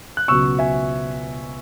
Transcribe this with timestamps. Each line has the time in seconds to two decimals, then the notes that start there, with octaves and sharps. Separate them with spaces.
0.17 F#6
0.28 C#2 B2 F#3 C#6 E6
0.59 E5 G#5